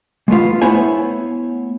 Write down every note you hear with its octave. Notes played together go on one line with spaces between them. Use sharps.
G#3 A3 B3 F4
A3 B3 E4 C5 C#5 G#5